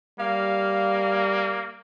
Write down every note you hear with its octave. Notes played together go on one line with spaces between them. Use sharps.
G3 A#3 F5